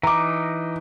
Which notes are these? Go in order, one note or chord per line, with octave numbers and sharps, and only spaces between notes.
E3 D#4 A#5 D6